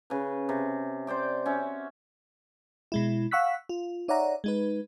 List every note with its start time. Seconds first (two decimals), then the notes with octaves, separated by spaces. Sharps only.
0.10 C#3 B4
0.49 C3
1.07 C5 D5 G5 D6
1.46 C#4 F#4 E5
2.92 B2 G#3 E4
3.31 F5 F#5 C#6 E6 F#6 B6
3.69 F4
4.08 D#4 C#5 D5 E5 F#5 A#5
4.44 G#3 D#4 B4